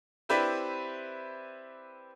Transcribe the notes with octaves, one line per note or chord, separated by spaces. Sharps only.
C4 E4 G4 B4 D5